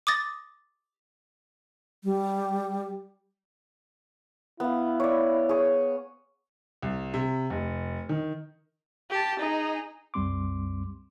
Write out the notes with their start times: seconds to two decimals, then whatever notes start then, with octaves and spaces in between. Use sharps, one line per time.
0.07 D6 D#6 A6 A#6
2.04 G3
4.60 B3 E4 F5
5.00 C#5 D5
5.49 G#4 C#5
6.83 C2
7.14 C3
7.50 F1
8.09 D#3
9.10 G4 A5
9.39 D#4 G#4
10.14 C2 F#2 G3 C4 C6 D6